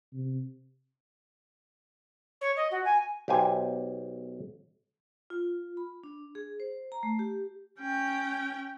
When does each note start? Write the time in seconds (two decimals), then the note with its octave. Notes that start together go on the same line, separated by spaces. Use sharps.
0.13 C3
2.41 C#5
2.56 D#5
2.71 F#4
2.85 G#5
3.28 B1 G4 C5 G#5
5.30 F4
5.77 B5
6.04 D4
6.35 G#4
6.60 C5
6.92 A#5
7.03 A3
7.19 G4
7.80 C#4 G5